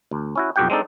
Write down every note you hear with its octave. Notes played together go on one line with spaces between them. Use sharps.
D2
C#4 E4 F#4
B1 F2 F#4 G4 F#5 G5
G#3 C4 D4 D#4 A4